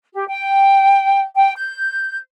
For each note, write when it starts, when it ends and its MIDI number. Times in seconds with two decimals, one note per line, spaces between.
0.13 0.25 67
0.27 1.21 79
1.33 1.53 79
1.56 2.17 91